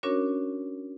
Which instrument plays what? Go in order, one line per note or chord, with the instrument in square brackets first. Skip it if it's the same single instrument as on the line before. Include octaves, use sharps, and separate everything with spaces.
[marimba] C#4 D4 F#4 A#4 C#5